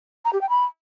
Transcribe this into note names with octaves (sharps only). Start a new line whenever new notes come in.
A#5
G4
G5
B5